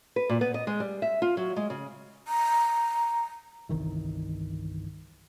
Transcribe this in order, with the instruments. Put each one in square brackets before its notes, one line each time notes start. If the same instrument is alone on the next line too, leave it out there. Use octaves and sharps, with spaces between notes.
[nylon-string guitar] B4
A#2
B3
D#5
G#3
G3
E5
F4
F#3
G#3
C#3
[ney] A#5
[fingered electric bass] G1 C2 D#3 E3